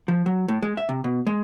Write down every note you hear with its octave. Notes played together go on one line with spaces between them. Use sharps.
F3
F#3
A2
G#3
E5
C3
B2
G#3